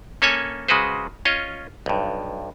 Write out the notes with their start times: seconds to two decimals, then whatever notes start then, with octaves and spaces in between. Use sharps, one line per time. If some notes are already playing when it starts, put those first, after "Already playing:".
0.22 A#3 C#4 A4 C#5 G#5
0.68 C#3 G#3 F#4 B4 C5
1.25 C#4 F4 C#5 D#5
1.86 B1 G2